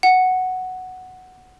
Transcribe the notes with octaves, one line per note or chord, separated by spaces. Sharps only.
F#5